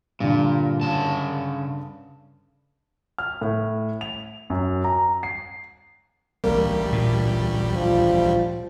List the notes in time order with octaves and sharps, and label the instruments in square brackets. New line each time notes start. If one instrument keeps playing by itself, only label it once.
[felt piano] G2 D3 [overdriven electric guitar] A#2
[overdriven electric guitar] C#3 A5
[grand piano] F6
A2
F7
F#2
A#5
C7
[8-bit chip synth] A1 D2 G3 [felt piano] A#3
[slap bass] A#2
[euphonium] F3